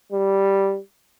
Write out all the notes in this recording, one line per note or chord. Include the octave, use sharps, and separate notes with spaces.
G3